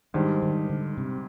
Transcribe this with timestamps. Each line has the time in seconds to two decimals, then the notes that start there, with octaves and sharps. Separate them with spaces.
0.14 G#2 D#3 G3 D4 G4 C5
0.42 D#3
0.70 D3
0.98 C3